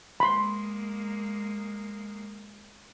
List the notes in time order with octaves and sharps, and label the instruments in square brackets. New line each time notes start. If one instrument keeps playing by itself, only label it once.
[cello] G#3 A#3 [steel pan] B5 C6